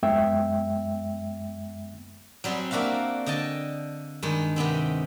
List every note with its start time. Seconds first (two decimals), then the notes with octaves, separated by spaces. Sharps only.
0.03 F#2 G#3 B3 E5 G5
2.44 F#3 G3 C4 G#4
2.71 A#3 D4 F#4 E5 F5
3.26 D3 D#5 G5 A5
4.23 G2 D#3 G#3
4.56 C3 D#3 B3 C4